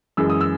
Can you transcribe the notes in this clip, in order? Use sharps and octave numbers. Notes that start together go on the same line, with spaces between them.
F#2 E3 G#3 E6
D#6
E6